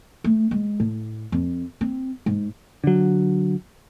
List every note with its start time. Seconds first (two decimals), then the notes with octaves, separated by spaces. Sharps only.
0.24 A3
0.51 G#3
0.80 A2
1.32 F2
1.81 C4
2.26 G#2
2.84 D3 F#3